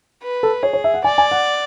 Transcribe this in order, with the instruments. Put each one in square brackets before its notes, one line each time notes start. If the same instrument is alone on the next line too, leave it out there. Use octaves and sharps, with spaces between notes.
[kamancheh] B4
[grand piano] A4
[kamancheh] G#4 [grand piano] C#5
[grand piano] C#5
E5
F#5
[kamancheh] D5 [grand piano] G#5
[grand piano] G#5
F#5